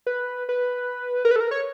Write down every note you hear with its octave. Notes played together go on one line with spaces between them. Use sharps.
B4
B4
A#4
B4
A4
A#4
C#5